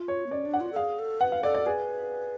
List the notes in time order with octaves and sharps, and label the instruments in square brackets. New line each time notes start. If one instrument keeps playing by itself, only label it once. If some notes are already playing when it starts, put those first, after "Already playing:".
Already playing: [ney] F4
[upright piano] C#5
[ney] B3
[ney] C#4 [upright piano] D5
[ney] D4
[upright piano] F#5
[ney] F4
A4
[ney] G#4 [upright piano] F5
[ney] A4
[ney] B4 [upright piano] F#5
[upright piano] F5
[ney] A4 [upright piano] D5
[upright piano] D5
[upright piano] G#4 [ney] B4